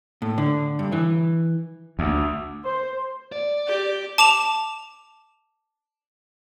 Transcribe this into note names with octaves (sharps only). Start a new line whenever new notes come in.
A2
D3
G2
E3
D2
C5
D5
G4
A5 D6 E7 F7